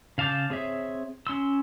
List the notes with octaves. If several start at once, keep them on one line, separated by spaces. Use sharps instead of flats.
C#3 F5 A5 D6 G6
C4 G#4 C#5 E5
C#4 C6 E6